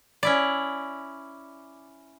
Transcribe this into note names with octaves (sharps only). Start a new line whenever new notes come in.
C#4 E4 D5